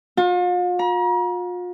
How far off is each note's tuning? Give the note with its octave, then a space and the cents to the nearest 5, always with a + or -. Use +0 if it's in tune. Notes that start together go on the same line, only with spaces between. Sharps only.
F4 +40
A#5 +40